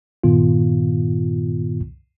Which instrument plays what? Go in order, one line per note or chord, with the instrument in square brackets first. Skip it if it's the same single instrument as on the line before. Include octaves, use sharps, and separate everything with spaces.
[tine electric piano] G2 A#2 D#3 B3 F4